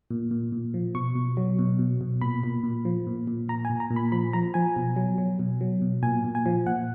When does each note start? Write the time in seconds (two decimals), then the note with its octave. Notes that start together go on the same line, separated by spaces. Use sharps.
0.11 A#2
0.31 A#2
0.52 A#2
0.74 F3
0.95 B2 C#6
1.15 B2
1.37 F#3
1.59 B2
1.79 B2
2.01 B2
2.21 A#2 B5
2.43 A#2
2.63 A#2
2.85 F3
3.07 A#2
3.27 A#2
3.49 A#2 A#5
3.65 G#5
3.70 A#2
3.80 A#5
3.90 A#2
3.96 B5
4.12 F3 B5
4.33 F3 A#5
4.54 F3 G#5
4.76 B2
4.96 F#3
5.18 F#3
5.39 B2
5.61 F#3
5.82 B2
6.03 A#2 G#5
6.24 A#2
6.35 G#5
6.46 F3
6.66 A#2 F#5